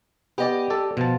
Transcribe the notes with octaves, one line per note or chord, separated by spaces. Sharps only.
B3 G4 D5 D#5
A4 D5
B2 F3 A5